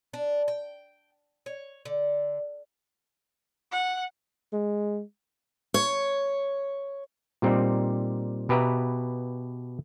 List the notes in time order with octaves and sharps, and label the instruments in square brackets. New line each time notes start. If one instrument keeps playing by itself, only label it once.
[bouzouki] D4
G5
C#5
D3
[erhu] F#5
[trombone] G#3
[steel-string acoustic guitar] C#5
[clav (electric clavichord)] A#2 G3 C4 D#4
B2 G4 B4 E5 A#5